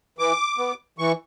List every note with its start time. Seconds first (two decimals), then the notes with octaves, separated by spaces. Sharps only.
0.19 E3 D6
0.58 B3
0.98 E3 C#6